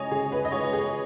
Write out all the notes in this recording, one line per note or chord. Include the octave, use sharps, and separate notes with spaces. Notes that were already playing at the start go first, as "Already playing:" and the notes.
Already playing: C#3 G#3 C#5 D#5 G#5
C#3 G#4
B4
D#5
G#3 C#5
G#4